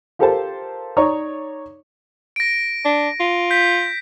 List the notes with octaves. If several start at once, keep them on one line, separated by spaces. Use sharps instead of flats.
F4 G4 A4 A#4 C5 A5
D#4 C#5 D5 A#5 C#6 D#6
A#6 D7
D4
F4
G6 B6